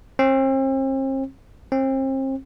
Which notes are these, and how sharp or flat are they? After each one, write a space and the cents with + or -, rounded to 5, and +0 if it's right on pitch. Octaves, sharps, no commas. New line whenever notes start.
C4 +40
C4 +35